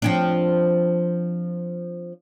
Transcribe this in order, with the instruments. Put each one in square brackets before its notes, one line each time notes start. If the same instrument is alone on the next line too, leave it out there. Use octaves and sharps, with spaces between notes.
[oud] F3 C4 D4